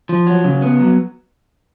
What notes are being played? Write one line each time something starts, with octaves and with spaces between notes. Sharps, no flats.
F3
F#3
C#3
B3
F#3